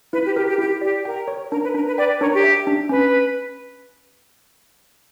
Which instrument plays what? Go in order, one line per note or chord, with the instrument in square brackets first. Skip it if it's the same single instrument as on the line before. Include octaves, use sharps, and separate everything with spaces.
[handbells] E4 [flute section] B4
[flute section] G4
[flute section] G4 [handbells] A#4
[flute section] G4
[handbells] E4 [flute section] G4
[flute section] G4 [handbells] D5
[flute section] A#4 [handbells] G5
[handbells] C#5
[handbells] D4 [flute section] A#4
[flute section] B4
[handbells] D4 [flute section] A#4
[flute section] B4
[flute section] B4 D5 [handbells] G5
[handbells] D4 [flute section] A#4 C#5
[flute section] G4
[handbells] E5
D4
[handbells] C#4 [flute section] B4